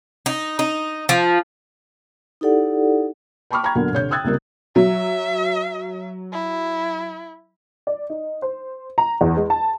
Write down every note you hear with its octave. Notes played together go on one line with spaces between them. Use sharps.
D#4
D#4
F3
D#4 E4 G4 A4 D5 F#5
G5 A5 B5 C#6 D6 F6
G5 A#5 B5 C#6 G#6
E2 D3 F#3 A#3
C2 D3 C#5 G6
G5 D#6 E6 F#6 G#6 A6
C#2 C3 G3 A#3
F#3 E5
E4
D5
D#4
C5
A#5
E2
G#3
A5